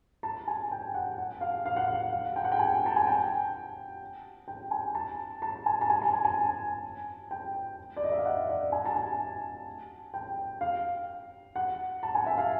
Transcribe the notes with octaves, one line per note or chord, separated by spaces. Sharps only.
A5
G#5
G5
F#5
F#5
F5
F5
F#5
F5
F5
G5
F#5
G5
G#5
A5
G#5
G5
G5
G#5
A5
A5
G#5
A5
G#5
A5
G#5
G#5
G5
D5
D#5
E5
F5
F#5
D5
G#5
A5
G#5
G5
F5
F#5
A5
G#5
E5
F5